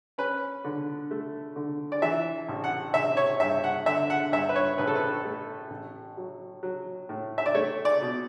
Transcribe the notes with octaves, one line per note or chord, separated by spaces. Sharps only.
C#4 B4
D3
A3
D3
D5
E3 E5
A1
F#5
A1 E5
C#5
G2 E5
F#5
D3 E5
F#5
G2 E5
B4
C#5
A1 B4
A4
B4
A3
A1
F#3
F#3
A2
E5
D5
A3 C#5
D5
B2